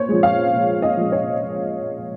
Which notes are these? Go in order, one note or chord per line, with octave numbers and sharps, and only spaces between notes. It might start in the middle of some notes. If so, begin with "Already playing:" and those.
Already playing: A#2 C5 C#5
F3 G#3
F5
A#2
D#5
F3 G#3
C#5